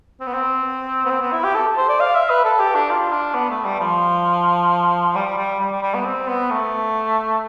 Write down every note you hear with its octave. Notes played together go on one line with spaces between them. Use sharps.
C4
B3
C4
B3
C4
B3
E4
G4
A4
C5
D5
F5
E5
B4
A4
G4
D4
F4
D4
B3
A3
G3
F3
G3
G3
G3
G3
G3
B3
C4
B3
A3